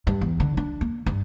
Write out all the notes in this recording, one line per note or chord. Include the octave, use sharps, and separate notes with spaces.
G2
E2
D3
D4
A#3
G2